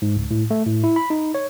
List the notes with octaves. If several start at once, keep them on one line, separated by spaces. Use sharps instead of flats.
G#2
C#2
A2
A3
A2
E4
B5
D#4
C#5